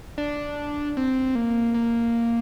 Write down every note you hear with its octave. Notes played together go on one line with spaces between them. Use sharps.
D4
C4
A#3
A#3